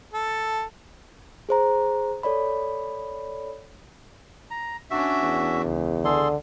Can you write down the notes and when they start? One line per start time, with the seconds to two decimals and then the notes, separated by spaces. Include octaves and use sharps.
0.13 A4
1.49 G#4 C5 A#5
2.23 A4 C#5 D5 B5
4.51 A#5
4.90 C#4 D4 F#4 E5
5.22 E2
5.65 C#2
6.05 D3 G#4 A4 C6